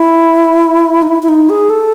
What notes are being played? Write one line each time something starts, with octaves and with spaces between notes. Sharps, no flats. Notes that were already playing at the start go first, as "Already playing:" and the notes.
Already playing: E4
D#4
E4
E4
D#4
G#4
A4